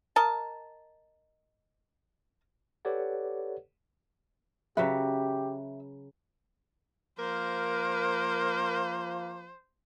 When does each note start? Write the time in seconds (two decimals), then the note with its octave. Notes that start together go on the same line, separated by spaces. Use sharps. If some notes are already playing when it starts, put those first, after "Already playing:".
0.16 A#4 D#5 A5
2.85 G4 A4 B4 C#5 D5 F#5
4.77 C#3 F#3 G4 B4 E5
7.19 F3 A#3 A#4 C5